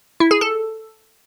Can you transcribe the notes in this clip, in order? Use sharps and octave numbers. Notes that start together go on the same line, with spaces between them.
E4
G#4
A4